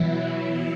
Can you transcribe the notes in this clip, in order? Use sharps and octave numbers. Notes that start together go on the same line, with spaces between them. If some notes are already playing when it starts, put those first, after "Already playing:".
Already playing: B2 E3 F#3 E4